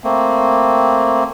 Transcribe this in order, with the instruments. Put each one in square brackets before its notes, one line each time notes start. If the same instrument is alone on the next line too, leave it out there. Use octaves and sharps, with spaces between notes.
[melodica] A3 A#3 C4